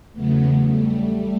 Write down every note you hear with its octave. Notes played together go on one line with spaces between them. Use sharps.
E2 C#3 F#3 A3 B3
G3 A3